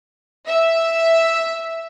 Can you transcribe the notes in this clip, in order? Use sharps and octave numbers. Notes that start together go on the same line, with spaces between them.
E5